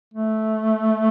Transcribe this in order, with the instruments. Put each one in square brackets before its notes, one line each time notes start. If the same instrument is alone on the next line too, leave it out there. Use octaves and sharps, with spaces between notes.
[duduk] A3